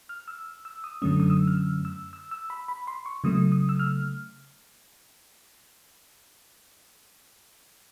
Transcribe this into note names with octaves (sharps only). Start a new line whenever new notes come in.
F6
E6
E6
D#6
F#2 D3 F#3 A3 C#4 D#6
D#6
E6
F6
E6
E6
E6
E6
B5
B5
C6
C#6
C#3 F#3 A3 D#6
D#6
E6
F6